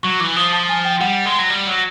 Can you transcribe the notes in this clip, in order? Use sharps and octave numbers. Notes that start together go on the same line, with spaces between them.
F#3 C#6
E3 D6
F3 D#6
A5
G#5
G5
G3 F#5
G#3
F#3
G3
F#3